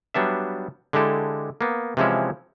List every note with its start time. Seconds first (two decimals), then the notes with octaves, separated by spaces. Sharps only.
0.14 F#3 G3 B3 D4 E5
0.93 D3 G#3 E4 G4 A4
1.61 A#3 B3
1.97 C3 E3 F3 G#3 C#4 E4